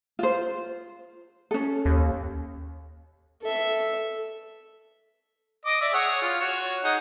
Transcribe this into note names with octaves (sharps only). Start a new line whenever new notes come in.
F4 C5
C#4 A4
D#2
A4 E5
D#5 D6
D5 E5
G#4 C#5 F#5
F4
F#4 C#5
D#4 G#4 F#5